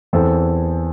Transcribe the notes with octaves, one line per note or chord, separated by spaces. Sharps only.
E2 E3 C4 A4 C5